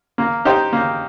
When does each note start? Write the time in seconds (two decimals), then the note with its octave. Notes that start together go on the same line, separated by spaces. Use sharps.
0.18 A#3
0.45 D#4 G4 C5
0.73 A#3